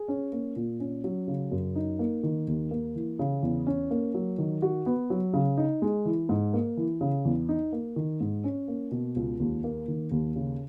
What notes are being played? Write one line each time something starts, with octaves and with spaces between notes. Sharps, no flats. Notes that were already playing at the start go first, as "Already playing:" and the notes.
Already playing: G#4
C#4
A#3
A#2
C#4
F#3
C#3
F#2
D#4
A#3
D#3
D#2
A#3
E3
C#3
E2
C#4
A#3
F#3
D#3
F#4
B3
F#3
C#3
D#4
G#3
E3
G#2
A#3
E3
C#3
E2
D#4
A#3
D#3
G#2
C#4
A#3
B2
C#2
D#2
A#3
D#3
D#2
C#3